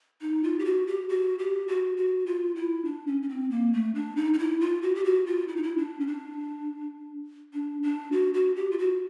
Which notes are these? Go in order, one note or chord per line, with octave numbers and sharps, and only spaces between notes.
D#4
F4
G4
F#4
G4
F#4
G4
F#4
F#4
F4
E4
D4
C#4
C#4
C4
A#3
A3
D4
D#4
D#4
E4
F4
F#4
G4
F#4
F4
E4
D#4
E4
D4
C#4
D4
D4
D4
F#4
F#4
G4
F4
F#4